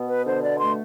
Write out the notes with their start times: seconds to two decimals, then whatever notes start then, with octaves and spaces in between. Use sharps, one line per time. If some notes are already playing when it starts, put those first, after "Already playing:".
Already playing: B2 B3
0.09 B4
0.26 D3 C5
0.43 D5
0.60 A3 C6